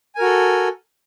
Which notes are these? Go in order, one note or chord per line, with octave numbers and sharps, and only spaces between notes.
F#4 A4 A#4 G#5